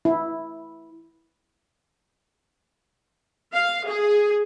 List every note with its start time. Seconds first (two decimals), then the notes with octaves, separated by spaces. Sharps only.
0.05 E4
3.52 F5
3.87 G#4